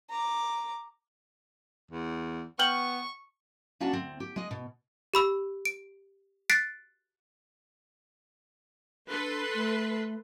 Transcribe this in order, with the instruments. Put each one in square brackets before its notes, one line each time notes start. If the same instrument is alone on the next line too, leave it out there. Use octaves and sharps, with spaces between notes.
[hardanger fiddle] A#5 D6
[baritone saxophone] E2
[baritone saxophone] B3 [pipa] G5 [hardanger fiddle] C#6 [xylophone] F6 F#7 G7
[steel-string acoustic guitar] A#3 C#4 D4 F#4 F#5 A5
D2 C4
G4
G#3 D#5
B2
[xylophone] G4 B5 E6
D7
F#6 A6 B6 C7 D7
[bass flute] D4 [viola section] A4 B4 C6
[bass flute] A3